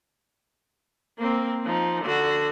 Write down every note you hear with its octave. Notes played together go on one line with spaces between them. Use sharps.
A#3 C4
F3 D#4
D3 F#4